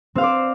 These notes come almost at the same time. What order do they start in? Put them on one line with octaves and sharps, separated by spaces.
C4 F5 C5 D5